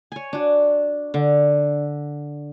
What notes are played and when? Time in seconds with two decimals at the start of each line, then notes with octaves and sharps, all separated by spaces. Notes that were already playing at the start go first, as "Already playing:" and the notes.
0.12 C#5 G#5
0.33 D4 F#4
1.14 D3